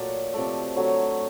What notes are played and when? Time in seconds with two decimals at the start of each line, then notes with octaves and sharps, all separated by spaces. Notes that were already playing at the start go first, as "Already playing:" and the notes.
Already playing: A#2 F#3 A3 D5
0.33 C3 F3 A3 D5
0.76 D3 F#3 A3 C#5